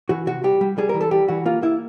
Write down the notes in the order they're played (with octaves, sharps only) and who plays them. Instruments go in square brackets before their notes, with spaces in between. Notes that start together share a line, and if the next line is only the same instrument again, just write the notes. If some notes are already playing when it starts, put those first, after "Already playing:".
[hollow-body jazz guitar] E3 F#4
C3 F#4
G3 G4
G3
G3 G#4
A#4
E3
A4
G3 G4
E3 F#4
A#3 F4
A#3 E4